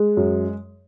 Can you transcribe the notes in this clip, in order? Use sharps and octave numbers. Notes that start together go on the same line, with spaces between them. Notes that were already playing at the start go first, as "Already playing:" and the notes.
Already playing: G#3
F#2